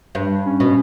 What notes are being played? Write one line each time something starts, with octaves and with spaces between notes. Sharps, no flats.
G2
C#4
B2